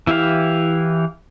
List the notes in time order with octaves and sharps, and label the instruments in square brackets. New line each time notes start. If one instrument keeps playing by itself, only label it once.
[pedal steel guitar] E3 E4 G4 F5